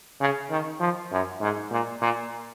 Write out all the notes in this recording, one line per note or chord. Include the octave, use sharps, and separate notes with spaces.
C#3
D#3
F3
F#2
G#2
A#2
A#2